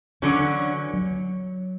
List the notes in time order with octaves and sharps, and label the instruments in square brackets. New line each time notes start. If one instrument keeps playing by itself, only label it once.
[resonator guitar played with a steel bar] D3 F#3 C#4 [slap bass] E3
[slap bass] F#3